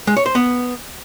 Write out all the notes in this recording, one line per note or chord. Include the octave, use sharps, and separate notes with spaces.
G#3
C#5
C5
B3